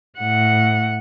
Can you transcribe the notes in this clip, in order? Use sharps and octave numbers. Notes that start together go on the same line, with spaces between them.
A2 F#5